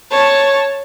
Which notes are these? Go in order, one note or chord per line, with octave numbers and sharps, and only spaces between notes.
C#5 A5